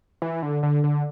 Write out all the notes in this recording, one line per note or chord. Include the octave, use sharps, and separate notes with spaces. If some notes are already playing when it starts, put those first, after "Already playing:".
E3
D3
D3
D3